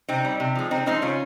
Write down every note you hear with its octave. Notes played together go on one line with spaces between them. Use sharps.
C3 C4 D#4
G3
C3
F3 G#3
C3 C4 D#4
F3 G#3 C4 D#4
C#3 C#4 F4